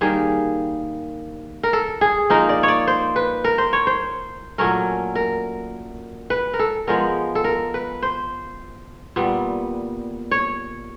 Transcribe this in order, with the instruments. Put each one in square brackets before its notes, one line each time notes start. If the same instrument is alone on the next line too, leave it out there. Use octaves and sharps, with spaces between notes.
[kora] D#3 G3 A#3 G#4
A#4
A4
G#4
F3 A#3 D#4 A#4
D5
C#5 D5
C5
B4
A#4
C5
C#5
C5
A#2 F#3 A3 C#4 A#4
A#4
B4
A#4
A4
F3 G#3 B3 A#4
A4
A#4
B4
C5
A#2 G3 B3
C#5